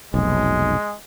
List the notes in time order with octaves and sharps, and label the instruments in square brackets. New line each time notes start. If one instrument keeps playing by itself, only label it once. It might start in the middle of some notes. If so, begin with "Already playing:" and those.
[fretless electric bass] F1 B1 [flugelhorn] G#3